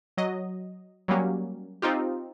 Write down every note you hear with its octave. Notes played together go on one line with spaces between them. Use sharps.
F#3 D#5
F#3 G3 A#3 C#4 G4
C4 D#4 F4 G4